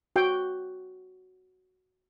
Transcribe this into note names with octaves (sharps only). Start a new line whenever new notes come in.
F#4 G5